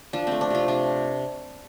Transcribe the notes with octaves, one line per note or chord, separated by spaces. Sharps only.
F3 D4
A3 C4
D4
C3 F4
C3 D4